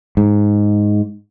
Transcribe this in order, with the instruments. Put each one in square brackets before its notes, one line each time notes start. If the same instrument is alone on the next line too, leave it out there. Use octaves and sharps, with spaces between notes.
[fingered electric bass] G#2